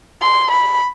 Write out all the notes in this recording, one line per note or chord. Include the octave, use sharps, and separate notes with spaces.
C6
B5